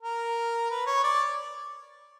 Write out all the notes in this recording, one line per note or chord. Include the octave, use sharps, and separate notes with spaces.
A#4
B4
C#5
D5